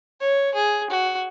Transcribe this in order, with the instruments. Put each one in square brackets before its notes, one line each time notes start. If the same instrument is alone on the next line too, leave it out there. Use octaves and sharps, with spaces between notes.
[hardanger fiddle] C#5
G#4
F#4